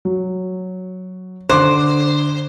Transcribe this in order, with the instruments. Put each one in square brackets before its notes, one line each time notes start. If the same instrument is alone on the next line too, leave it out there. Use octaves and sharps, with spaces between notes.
[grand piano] F#3
[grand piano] D3 D6 F#6 [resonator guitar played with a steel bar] C5